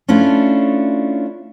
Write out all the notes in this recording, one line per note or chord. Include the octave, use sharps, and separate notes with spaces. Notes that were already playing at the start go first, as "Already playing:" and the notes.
A3 C#4 D4 E4 F4